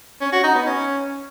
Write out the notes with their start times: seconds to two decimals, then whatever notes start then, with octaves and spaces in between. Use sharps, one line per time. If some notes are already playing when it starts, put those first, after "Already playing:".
0.21 C#4
0.32 F#4
0.44 D#4
0.55 B3
0.66 C#4